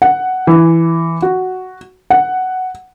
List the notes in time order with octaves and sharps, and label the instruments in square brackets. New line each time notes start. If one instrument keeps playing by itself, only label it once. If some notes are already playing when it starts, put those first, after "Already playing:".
[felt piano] F#5
E3
F#4
F#5